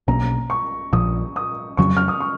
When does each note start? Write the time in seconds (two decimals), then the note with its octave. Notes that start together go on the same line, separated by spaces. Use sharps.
0.08 B1 B2 A#3 C#4 A#5
0.50 C#6
0.93 A#1 A#2 F3 D#6
1.36 D#6
1.77 F2 C#3 F#3 C#4 C#6
1.97 F6
2.08 D#6
2.20 C#6